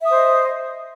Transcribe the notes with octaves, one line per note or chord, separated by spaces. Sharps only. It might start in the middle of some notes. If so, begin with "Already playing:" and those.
C5 D#5 E5 D#6